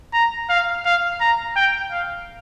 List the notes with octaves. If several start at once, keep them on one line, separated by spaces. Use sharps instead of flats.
A#5
F5
F5
A#5
G5
F5